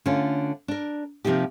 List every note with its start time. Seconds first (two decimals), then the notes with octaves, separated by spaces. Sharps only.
0.06 D3 A3 C#4 F4
0.68 D4 A#4
1.25 C3 F3 A#3 D#4 G4